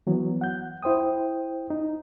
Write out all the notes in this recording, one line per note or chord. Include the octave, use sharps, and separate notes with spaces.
E3 F#3 B3
F#5 G6
E4 C5 G5 D#6
D#4